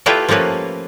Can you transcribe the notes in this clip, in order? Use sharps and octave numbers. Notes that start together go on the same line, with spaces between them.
A3 E4 F4 G4 B4 E5
F3 A3 A#3 C#4 B4